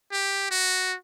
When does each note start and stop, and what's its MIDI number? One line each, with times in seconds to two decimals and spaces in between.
0.12 0.49 67
0.51 0.96 66